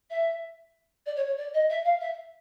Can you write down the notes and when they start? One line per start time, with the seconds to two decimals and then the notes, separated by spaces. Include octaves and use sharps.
0.10 E5
1.06 D5
1.16 C#5
1.27 C#5
1.37 D5
1.54 D#5
1.69 E5
1.84 F5
2.00 E5